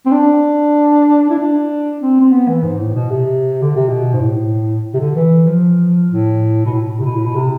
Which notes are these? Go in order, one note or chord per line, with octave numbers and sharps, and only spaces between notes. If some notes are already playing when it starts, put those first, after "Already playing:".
C4
D4
E4
D4
C4
C4
B3
E3
G#2
A2
B2
C3
D3
C3
B2
G#2
A2
C3
D3
E3
F3
A2
B2
A2
C3
B2
A2
B2
C3